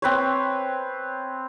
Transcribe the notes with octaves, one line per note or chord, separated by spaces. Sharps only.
C4 B4 C#5